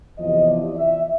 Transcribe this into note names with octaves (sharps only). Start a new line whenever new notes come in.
E2 C3 F3 D#5
D5
E5